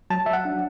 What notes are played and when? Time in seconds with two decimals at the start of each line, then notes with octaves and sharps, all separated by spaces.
0.10 F#3 A5
0.26 F#3 E5
0.33 F#5
0.45 D4